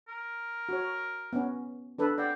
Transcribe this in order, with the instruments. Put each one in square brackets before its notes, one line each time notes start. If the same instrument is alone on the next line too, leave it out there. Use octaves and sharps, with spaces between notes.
[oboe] A#4
[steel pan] F#4 C#5
B3 C#4
D4 A4 B4
[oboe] C4 [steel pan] D5 F#5